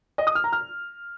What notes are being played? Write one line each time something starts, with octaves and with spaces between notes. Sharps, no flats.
D#5
D#6
F6
A#5
F6